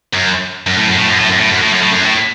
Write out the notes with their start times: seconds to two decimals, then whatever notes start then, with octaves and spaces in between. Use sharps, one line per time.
0.14 F#2
0.67 F#2
0.77 A2
0.87 F#2
0.97 A2
1.08 F#2
1.18 A2
1.29 F#2
1.39 A2
1.49 F#2
1.60 A2
1.70 F#2
1.81 A2
1.91 F#2
2.02 A2